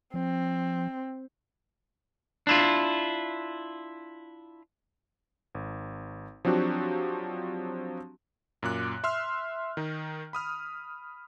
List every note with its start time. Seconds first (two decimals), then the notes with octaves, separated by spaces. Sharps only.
0.14 F3 C4
2.47 D4 E4 F4
5.55 G#1
6.45 F3 F#3 C4 D4 F#4 G4
8.63 F#2 A#2 D6 F#6
9.04 E5 C6 E6 F6
9.77 D#3 D#4
10.33 B5 D#6 F6